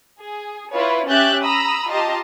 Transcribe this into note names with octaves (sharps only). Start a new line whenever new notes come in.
G#4
E4 F4 B4 C#5
C#4 G4 E5 F#6 G6 A6
A#5 B5 D#6 E6
F4 G4 D#5 A5 A#5 C6